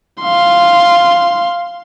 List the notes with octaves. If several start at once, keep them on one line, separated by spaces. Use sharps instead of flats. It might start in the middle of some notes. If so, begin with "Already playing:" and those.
F5 C6